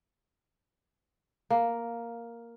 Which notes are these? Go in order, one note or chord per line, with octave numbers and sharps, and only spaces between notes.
A#3